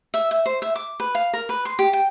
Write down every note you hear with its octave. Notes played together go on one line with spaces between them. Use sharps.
E5
E5
C5
E5
D6
B4
F5
A#4
B4
C6
G4
G5